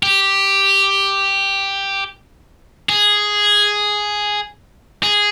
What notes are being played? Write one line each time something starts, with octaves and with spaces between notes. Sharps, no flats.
G4
G#4
G#4